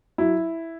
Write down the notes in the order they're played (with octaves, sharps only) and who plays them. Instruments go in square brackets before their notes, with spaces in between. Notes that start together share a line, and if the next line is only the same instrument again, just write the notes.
[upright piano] F#3 E4